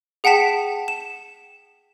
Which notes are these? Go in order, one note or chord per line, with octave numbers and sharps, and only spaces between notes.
G#4 F#5 G5 A5 B6 E7
E7